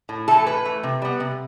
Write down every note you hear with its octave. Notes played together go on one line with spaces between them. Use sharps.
A2
E3 A3 A4
A2 B4
E3 A3
C3
G3 B3
C3